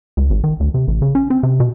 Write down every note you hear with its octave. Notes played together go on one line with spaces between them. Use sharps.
C#2
G#1
D#3
D2
C3
A1
C#3
C#4
C4
C3
B2